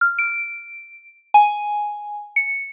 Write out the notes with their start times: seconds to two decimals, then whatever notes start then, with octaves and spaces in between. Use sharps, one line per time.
0.01 F6
0.19 D7
1.34 G#5
2.36 C#7